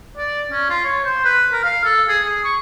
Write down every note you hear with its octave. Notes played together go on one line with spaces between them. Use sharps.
D5
C#4
F4
C#5
C5
B4
A#4
F5
A4
G#4
G#4
C#6